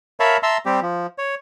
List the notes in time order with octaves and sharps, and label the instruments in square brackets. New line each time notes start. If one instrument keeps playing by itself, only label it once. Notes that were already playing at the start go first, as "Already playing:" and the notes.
[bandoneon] A#4 C#5 E5 F5 A5 B5
E5 A5 A#5 C6 E6
G3 C4 G4
F3
C#5